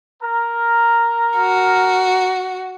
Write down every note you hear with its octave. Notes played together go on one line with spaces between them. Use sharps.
A#4
F#4